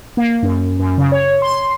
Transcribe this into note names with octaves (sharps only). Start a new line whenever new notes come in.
A#3
F#2
F#2
C#3
C#5
C6